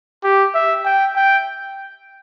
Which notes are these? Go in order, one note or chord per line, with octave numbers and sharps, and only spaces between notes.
G4
E5
G5
G5